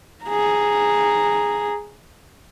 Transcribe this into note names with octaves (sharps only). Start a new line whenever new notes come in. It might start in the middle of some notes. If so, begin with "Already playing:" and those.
G#4 A#5